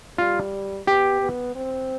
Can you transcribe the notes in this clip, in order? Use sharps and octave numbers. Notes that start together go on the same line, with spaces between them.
G3 F4
B3 G4
B3
C4